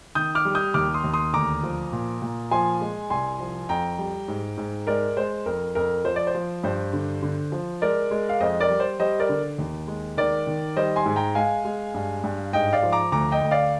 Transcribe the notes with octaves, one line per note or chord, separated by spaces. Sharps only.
D#3 D#6 G6
D6 F6
G3
D#6 G6
D#2 D6 F6
C6 D#6
D#2
C6 D#6
D2 A#5 D6
F3
A#2
A#2
F3 G#5 C6
G#3
C2 G#5 C6
F3
F2 G5 A#5
G3
G#2
G#2
G#3 A#4 D5
G#3 C5
F2 A#4
F2 A#4
F3 C5
D5
C5
F3
G2 C5
D3
D3
F3
G#3 A#4 D5
G#3
F5
F2 C5 D#5
A#4 D5
G3
C5
G3 C5 D#5
A#4 D5
D3
D#2
G#3
D#3 A#4 D5
D#3
G3 C5 D#5
G#5 C6
G#2
G5 A#5
G#3 F5 G#5
G#3
G2
G2
G#2 D#5 G5
D5 F5
F3
A#5 D6
D2 A#5 D6
D#5 G5
D2
D5 F5